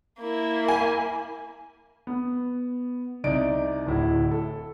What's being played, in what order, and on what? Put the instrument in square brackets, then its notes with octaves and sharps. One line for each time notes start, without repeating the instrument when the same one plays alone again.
[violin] A#3 E4
[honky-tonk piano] G#5
[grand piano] B3
C2 D#4 D5 D7
D1 A2 E4
A4